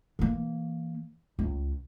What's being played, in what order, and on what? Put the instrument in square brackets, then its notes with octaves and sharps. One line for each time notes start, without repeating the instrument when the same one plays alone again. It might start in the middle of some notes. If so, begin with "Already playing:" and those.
[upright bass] E3 A#3
C#2